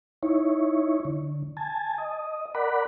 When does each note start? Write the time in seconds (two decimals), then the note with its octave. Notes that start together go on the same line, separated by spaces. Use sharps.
0.23 D#4 E4 C#5
1.05 D3
1.57 G#5 A5
1.98 D#5
2.55 A#4 D5 F#5 B5